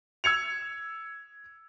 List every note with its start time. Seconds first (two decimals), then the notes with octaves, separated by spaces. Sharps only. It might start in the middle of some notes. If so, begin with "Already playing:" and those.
0.24 E6 G#6 C#7 F7